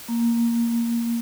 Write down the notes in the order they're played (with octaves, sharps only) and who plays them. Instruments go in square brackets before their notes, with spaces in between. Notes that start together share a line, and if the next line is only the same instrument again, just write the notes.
[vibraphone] A#3